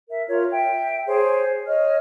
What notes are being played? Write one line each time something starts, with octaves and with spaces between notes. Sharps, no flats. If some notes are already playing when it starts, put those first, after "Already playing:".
A#4 E5
F4 A#4 C#5
E5 G5
G#4 C5 C#5
C#5 D#5 F6